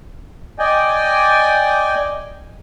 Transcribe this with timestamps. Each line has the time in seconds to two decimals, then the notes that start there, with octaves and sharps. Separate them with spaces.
0.59 D5 D#5 G5 G#5